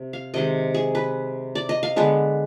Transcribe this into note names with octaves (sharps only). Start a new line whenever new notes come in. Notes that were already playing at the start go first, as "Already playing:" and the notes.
Already playing: C3
F5
C3 D#3 G#3 D#5
G#4
B4
D5
D#5
F5
D3 G#3 B3